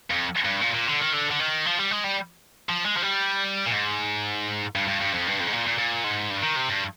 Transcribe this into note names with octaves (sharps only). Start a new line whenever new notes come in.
F2
G2
A#2
A#2
D3
D#3
D3
D3
D#3
F3
G3
G#3
G3
F3
G#3
F3
G3
A#2
G#2
G2
G2
G2
F2
G2
F2
G#2
A#2
A#2
A#2
G#2
G2
D#3
C3
G2